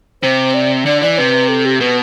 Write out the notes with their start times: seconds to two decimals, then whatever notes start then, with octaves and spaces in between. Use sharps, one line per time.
0.22 C3 C5
0.54 D5
0.86 D3 D5
1.01 E3 D5
1.18 C3 B4
1.49 A4
1.65 G4
1.80 B2 B4